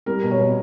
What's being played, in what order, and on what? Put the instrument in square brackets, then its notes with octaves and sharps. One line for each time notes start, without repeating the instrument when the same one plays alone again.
[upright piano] G3 [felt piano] A#4
[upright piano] B2
[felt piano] C#5
[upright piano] B2